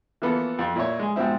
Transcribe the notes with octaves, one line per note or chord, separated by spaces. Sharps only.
E3 F3 A#3 B3 A4 B4
F2
A#2 E4 C#5
G#3 G#4
G#2 B2 F3 C4 E4